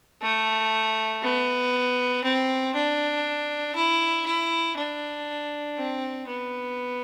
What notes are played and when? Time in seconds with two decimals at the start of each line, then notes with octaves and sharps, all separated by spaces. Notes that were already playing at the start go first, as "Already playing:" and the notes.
0.22 A3
1.23 B3
2.24 C4
2.75 D4
3.76 E4
4.26 E4
4.77 D4
5.78 C4
6.29 B3